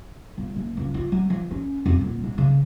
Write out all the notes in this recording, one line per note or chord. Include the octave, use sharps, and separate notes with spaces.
G1
F#1
C#2
F4
F#3
F3
C#4
F2
D#1
G#2
C#3